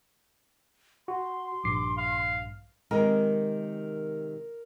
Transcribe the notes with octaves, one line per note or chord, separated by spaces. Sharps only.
F#4 C6
A#1 G2 D6 C7
F5
C3 D#3 G#3 A#4